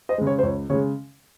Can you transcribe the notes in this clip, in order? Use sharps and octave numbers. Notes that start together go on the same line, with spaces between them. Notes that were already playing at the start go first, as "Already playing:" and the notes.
C5 D#5
C#3 G#3
C#5
C5
C#2 C#5
C#3 G#3 C#5